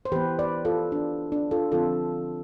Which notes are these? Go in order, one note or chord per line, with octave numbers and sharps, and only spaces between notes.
C5
E3 B3 G4 B4
B4 D5
F4 A4
D4
D4
F4 A4
D3 F3 C4 F4 A4